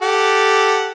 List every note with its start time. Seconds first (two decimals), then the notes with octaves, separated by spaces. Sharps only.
0.02 G4 A4 F#5